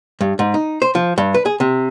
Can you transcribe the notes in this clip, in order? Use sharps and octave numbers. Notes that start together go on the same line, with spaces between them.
G2
G#2
D#4
C5
F3
G2
B4
G#4
C3